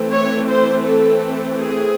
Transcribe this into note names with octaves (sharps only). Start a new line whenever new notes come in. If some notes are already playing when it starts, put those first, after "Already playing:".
Already playing: E3 A3 C4
C#5
C5
A4
G#4